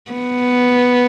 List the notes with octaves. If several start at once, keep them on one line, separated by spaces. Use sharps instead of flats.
B3